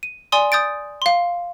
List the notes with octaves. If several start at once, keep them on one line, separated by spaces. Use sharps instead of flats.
D#7
D5 G#5 C6 D#6
D#6 G6 A6 D7
F5 C6